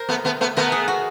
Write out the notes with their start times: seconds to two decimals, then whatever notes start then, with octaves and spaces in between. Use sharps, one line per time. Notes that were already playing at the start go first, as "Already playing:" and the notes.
Already playing: A#4 C5
0.09 A3 B3
0.25 A3 B3
0.41 A3 B3
0.56 A3 B3 A#4
0.72 G#4
0.88 F#4